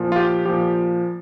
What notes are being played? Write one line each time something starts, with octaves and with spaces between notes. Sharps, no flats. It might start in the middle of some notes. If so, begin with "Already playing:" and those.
Already playing: A#2 F3
F4
G4
A#2 F3 G4